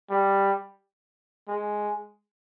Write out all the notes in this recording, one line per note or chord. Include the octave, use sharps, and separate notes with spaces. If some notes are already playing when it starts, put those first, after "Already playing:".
G3
G#3